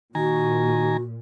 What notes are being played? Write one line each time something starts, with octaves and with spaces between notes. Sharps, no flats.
A#2 D#3 F#4 G#5 A#5